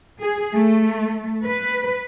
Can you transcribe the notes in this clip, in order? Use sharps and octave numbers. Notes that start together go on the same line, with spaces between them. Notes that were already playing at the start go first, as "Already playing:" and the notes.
G#4
A3
B4